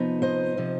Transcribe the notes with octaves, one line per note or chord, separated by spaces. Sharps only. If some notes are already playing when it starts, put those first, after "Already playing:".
Already playing: C3 F3 B3 D#4
C5 D#5
C3 F3